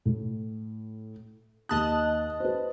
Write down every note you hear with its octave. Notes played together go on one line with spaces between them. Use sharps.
A2
D#2 D#5 A5 D#6 F#6
B4 C5